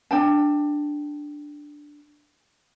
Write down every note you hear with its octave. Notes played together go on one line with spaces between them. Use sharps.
D4 G5 A5